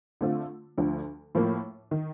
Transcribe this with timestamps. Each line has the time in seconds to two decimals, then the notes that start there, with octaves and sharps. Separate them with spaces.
0.21 D3 A3 C4 F4
0.78 D2 D3 F3
1.35 A2 F3 A#3
1.91 D#3